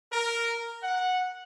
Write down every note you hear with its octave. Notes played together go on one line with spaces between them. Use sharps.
A#4
F#5